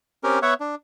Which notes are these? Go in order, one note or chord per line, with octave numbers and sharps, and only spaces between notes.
C4 C#4 G4 A#4
B3 C#5 E5 F#5
D4